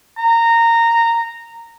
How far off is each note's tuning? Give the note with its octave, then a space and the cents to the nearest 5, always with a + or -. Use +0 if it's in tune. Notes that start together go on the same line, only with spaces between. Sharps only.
A#5 -15